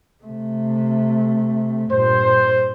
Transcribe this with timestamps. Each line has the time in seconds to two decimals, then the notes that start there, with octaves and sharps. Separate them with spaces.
0.24 C3 A3
1.91 G2 A#2 C5